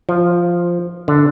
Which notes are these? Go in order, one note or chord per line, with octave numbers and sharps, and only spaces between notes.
F3
D3